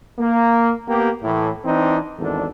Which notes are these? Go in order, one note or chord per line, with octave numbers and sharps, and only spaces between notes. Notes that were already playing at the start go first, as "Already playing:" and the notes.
A#3
A#3 B3 G4
A2 E3
E3 C4 D4 D#4
G#1 E2 D4 A4